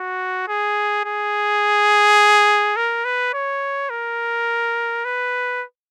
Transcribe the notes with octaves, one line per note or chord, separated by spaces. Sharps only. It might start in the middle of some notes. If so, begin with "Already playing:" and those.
Already playing: F#4
G#4
G#4
A#4
B4
C#5
A#4
B4